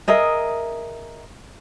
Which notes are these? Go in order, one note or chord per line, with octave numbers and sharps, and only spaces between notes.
G#4 A#4 D#5 E5